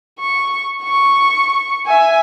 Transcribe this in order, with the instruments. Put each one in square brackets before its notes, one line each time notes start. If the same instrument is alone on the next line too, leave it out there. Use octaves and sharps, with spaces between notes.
[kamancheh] C#6
C#6
E5 G#5